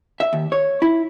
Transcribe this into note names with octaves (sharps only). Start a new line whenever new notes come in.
E5
D#2
C#5
E4